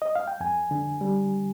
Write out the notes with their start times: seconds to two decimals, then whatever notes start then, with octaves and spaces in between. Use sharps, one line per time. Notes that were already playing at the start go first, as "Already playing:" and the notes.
0.02 D#5
0.15 F5
0.28 G5
0.40 F2 G#5
0.71 D3
1.01 G3